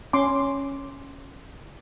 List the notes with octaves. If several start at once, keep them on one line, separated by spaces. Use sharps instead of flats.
C#4 C6 D6